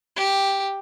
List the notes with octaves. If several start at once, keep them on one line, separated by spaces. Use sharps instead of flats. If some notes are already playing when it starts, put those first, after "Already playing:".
G4